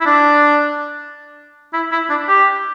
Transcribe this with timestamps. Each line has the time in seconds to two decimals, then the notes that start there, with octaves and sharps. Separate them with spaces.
0.01 E4
0.06 D4
1.73 E4
1.92 E4
2.10 D4
2.28 G4